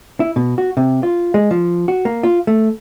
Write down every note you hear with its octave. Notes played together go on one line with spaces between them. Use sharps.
E4
B2
F#4
C3
F4
G#3
F3
F#4
A#3
F4
A3